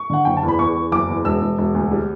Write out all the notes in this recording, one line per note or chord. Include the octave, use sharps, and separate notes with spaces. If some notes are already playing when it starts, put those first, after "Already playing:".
Already playing: C#6
D3 F#5
F#1 G5
A5
E2
B5
E2 C#6
E2
F#1 D6
E2
E1 E6
E1
E1
D2
G3